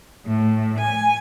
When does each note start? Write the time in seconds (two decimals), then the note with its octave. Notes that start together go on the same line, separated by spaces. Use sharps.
0.24 A2
0.78 G#5